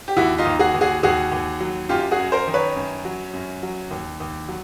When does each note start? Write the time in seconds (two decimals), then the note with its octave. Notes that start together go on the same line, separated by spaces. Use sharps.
0.08 G4
0.17 D#2 E4 F#4
0.38 D#4 F4
0.45 D#2
0.59 F#4 G#4
0.74 D#2
0.81 F#4 G#4
1.03 D#2 F#4 G#4
1.32 D#2
1.60 F#3
1.89 F#2 F4 G4
2.11 F#4 G#4
2.19 F#2
2.32 A#4 C5
2.47 D#3
2.54 B4 C#5
2.76 F#2
3.05 F#3
3.33 F#2
3.63 F#3
3.91 D#2
4.20 D#2
4.48 F#3